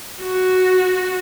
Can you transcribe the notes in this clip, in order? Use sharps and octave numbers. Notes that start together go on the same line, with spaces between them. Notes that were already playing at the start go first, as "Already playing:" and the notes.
F#4